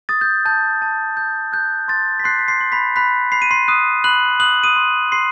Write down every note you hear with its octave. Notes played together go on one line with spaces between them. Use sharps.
D#6 A6
G6
A5 G6
A5
G6
F#6 G6
C6 A6
B6
C6 F#6 C7
B6
C6 C7
C6
B5 B6
B5 F#6 B6
B5 C7
D#7
C6 C7
D#6 F#6 D#7
B5 F#6 F#7
D#6 F#6 F#7
D#6 D#7
C6
C6 C7